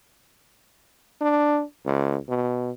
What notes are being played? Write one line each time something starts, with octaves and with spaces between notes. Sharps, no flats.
D4
C#2
B2